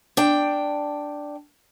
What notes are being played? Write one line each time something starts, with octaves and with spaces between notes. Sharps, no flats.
D4 G5